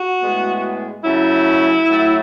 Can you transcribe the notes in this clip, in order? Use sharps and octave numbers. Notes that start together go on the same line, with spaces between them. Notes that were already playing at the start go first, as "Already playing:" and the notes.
Already playing: F#4
A2 G#3 B3
C#3 F#3 A3 E4
A2 F#3 A3